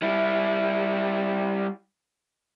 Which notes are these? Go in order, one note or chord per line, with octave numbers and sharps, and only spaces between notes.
G3 E4